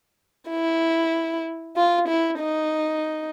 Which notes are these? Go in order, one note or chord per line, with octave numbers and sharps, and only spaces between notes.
E4
F4
E4
D#4